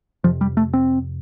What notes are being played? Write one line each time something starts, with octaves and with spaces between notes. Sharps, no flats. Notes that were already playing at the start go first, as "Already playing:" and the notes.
F2 C3 F3
G3
A3
C4